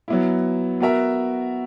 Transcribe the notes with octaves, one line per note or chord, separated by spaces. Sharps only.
F#3 B3 E4
B3 F#4 A#4 E5